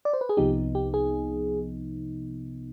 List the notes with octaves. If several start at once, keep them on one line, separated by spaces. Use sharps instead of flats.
D5
C5
B4
G#4
C2 C3 F3 B3 D#4 G4
G4
G#4